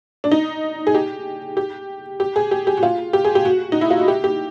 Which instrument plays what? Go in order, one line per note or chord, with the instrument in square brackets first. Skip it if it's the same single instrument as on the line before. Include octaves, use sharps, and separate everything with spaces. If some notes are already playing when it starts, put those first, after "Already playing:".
[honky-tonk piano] D4
D#4
G#4
G4
G4
G4
G#4
G4
G4
F#4
F4
G4
G#4
G4
F#4
D#4
E4
F4
F#4
G4
G4